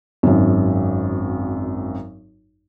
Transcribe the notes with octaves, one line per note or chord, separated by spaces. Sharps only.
G#1 F#2